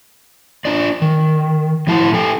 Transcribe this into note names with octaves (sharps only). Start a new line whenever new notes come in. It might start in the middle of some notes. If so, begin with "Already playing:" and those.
D4 F4 D5
D#3
A2 F3 E4 A5
C4 A4 G5 G#5